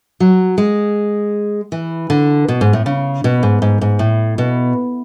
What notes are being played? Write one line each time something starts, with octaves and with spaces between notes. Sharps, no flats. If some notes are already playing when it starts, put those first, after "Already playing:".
F#3
G#3
E3
D3
B2
G#2
A2
C#3
B2
G#2
G#2
G#2
A2
B2